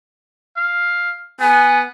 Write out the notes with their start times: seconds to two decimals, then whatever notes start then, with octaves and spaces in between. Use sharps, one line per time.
0.57 F5
1.40 B3 G#5